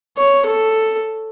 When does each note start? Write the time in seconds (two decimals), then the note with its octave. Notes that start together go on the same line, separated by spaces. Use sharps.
0.17 C#5
0.46 A4